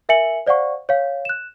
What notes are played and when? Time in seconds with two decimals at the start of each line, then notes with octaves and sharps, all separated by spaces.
0.09 A#4 E5 G#5 C#7 F#7
0.46 C5 D5 F5 F#5 C#6
0.89 C#5 F5
1.25 F#6 E7